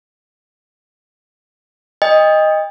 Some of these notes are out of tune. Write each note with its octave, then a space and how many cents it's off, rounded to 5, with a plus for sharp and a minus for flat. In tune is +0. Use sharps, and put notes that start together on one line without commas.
D#5 +0 G5 +40